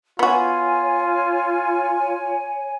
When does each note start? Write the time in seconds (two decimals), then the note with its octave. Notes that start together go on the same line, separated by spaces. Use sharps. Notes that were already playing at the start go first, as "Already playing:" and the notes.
0.19 B3 F4 F#4 C#5 G#5